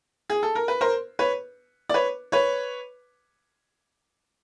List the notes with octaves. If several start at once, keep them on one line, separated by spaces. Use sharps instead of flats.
G#4
A4
A#4
B4
A#4 C5
B4 C#5
D5
B4 C#5
B4 C#5